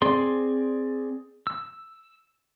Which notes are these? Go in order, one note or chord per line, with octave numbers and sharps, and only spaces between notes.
C4 G#4 D5 C6
E6